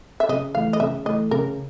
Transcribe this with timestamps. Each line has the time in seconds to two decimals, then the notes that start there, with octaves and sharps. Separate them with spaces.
0.20 E5
0.29 C#3 D#5
0.55 E3 A3 F5
0.73 D#5
0.80 C#3 E5
1.05 E3 A3 D#5
1.31 C#3 A#4